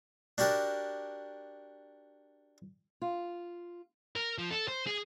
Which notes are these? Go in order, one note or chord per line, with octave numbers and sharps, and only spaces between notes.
D4 F#4 G4 A#4 A5
F4
A#4
F3
A4
C5
G#4